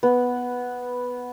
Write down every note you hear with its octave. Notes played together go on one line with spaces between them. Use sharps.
B3